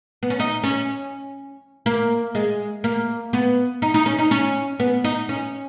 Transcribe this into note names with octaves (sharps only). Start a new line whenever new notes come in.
B3
C#4
D#4
C#4
A#3
G#3
A#3
B3
D#4
D#4
C#4
D#4
C#4
B3
D#4
C#4